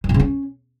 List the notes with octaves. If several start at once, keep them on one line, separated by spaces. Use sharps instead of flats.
D#3
A#2
C#3
C#4